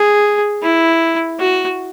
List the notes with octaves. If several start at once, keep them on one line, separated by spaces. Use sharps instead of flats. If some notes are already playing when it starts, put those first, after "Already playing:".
Already playing: G#4
E4
F#4